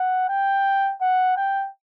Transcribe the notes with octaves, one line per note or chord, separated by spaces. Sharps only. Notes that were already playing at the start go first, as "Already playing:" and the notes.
Already playing: F#5
G5
F#5
G5